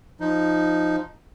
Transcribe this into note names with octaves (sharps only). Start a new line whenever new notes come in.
F3 D#4